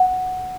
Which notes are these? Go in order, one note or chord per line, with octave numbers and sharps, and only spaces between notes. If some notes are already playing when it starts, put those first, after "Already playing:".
Already playing: F#5